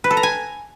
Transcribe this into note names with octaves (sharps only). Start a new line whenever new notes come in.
B4
A4
A#5
G#5